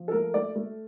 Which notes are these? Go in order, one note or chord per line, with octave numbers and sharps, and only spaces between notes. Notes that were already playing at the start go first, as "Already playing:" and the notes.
Already playing: F3
A4
A3 A#4
A3 D5
A3